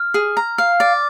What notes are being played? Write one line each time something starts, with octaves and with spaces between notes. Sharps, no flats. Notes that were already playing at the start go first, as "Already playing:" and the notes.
Already playing: F6
G#4
A#5
F5
D5